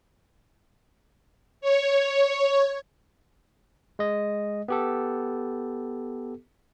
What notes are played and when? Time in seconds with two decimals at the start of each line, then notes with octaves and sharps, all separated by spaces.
1.61 C#5
3.99 G#3 D#5
4.68 B3 G4 A4